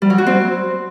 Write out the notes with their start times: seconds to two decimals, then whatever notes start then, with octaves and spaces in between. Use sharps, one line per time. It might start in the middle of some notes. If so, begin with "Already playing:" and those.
0.02 G3
0.10 F#3
0.18 F#4
0.26 C4